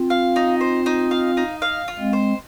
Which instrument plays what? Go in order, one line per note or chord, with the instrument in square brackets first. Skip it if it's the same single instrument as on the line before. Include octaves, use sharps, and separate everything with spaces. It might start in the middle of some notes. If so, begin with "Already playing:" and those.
Already playing: [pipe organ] C4 F4
[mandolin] F5
D#4
C5
D#4
F5
D#4
F5
F4
[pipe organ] G#3 C4
[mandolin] C5